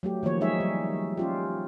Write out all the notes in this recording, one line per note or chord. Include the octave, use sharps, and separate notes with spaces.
F#3 A3 G4
D#3 F3 A#3 C#5
F#3 G#3 D#4 G#4 E5
G3
C#4 F4 G4